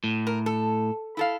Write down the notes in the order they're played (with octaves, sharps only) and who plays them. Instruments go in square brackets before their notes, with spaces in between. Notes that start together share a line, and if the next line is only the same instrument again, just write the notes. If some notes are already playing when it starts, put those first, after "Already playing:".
[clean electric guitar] A2
[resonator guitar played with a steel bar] A#4
A4
E4 A4 F5